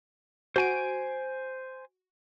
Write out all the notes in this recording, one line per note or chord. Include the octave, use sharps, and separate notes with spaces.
F#4 C5 G#5 D7